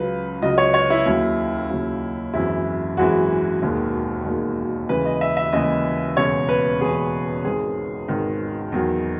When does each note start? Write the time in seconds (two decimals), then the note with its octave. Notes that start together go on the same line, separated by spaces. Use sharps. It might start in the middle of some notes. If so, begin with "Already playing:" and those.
Already playing: C#2 C#3 F#3 B4
0.42 C#2 C#3 F#3 D#5
0.58 C#5
0.74 C#5
0.90 E4
1.06 D#2 C#3 F#3
1.70 D#2 C#3 F#3
2.34 G#1 F#2 E3 G#3 E4
2.97 G#1 F#2 E3 G#3 F#4
3.62 E1 D#2 D#3 G#3
4.25 E1 D#2 D#3 G#3
4.89 D#2 C#3 E3 G#3 B4
5.06 D#5
5.21 E5
5.37 E5
5.53 D#2 C#3 E3 G#3 D#5
6.17 E1 E2 C#3 G#3 C#5
6.49 B4
6.81 E1 E2 C#3 G#3 G#4
7.44 G#1 G#2 D#3 G#3 G#4
8.08 G#1 G#2 D#3 G#3
8.72 E2 D#3 F#3